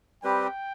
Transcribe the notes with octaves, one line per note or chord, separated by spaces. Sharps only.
G3 C4 G4 B4 G5